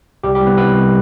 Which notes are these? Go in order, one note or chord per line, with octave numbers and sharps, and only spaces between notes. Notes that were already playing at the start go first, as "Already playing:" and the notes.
C2 G3 G4
G3 G4
C2
B3 B4
C2 B3 B4
C3